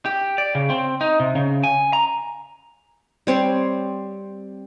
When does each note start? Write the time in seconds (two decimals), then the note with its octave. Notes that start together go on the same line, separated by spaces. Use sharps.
0.06 G4
0.38 D5
0.55 C#3
0.70 C4
1.01 D#4
1.20 C3
1.35 C#3
1.63 G#5
1.93 A#5
3.27 G3 C4 C#5 C6